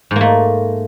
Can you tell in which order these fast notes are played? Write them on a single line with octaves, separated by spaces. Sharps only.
G#2 A#3 A3